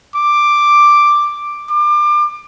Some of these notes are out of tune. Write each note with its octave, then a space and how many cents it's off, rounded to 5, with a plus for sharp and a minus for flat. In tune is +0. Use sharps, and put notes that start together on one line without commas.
D6 +5
D6 +30